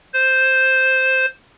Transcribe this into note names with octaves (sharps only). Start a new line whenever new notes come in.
C5